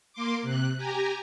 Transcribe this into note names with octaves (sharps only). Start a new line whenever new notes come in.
A#3 C6 D6
C3 F#6
G4 G#5 A#5